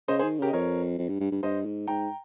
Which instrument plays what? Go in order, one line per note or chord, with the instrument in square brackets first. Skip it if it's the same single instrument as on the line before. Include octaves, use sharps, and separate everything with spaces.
[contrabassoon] C#3 [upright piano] C5 D#5
[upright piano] G#4 C5
[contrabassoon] D#3
[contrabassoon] C#3 [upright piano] G4 A#4
[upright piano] D#5
[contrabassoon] F2 [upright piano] A#4 C#5
[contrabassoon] F2
G2
G2
G2
[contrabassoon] G2 [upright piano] C5 D#5
[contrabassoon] G#2
[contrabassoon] G#2 [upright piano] G5 A#5